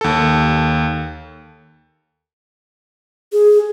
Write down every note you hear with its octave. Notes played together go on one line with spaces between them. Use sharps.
D#2 A4
G#4